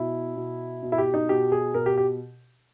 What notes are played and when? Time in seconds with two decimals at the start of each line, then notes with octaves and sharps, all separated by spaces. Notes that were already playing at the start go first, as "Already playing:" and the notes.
Already playing: B2 E4
0.36 B2
0.83 B2
0.92 E4
0.98 G4
1.14 D#4
1.29 B2 G4
1.52 G#4
1.74 B2 A#4
1.86 G4
1.97 G4